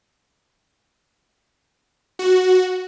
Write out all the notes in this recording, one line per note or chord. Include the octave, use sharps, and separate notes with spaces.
F#4